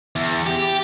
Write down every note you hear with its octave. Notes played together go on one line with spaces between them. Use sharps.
E2
G4